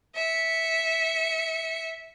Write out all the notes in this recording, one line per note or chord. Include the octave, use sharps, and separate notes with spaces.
E5 C#7